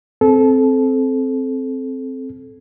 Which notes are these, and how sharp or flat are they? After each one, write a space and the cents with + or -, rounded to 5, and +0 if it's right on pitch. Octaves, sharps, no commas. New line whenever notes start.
C4 +0 A4 -25